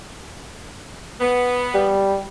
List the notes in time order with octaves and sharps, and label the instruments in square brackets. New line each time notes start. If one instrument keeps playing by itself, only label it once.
[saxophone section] B3
[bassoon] G3